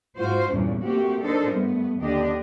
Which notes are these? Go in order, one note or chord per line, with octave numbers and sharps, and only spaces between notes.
G#2 F4 F#4 C5
E2 G2 A#2 C#3
A3 A#3 C4 F#4 G4
D4 D#4 A4 A#4 C5 D#5
G2 A3 B3
D#2 D3 D4 G4 D#5